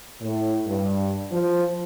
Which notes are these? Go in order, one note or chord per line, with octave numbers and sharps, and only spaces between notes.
A2
G2
F3